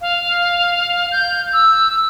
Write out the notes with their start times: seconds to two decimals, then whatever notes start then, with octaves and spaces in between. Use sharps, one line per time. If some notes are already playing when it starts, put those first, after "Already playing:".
0.01 F5
1.12 G6
1.53 E6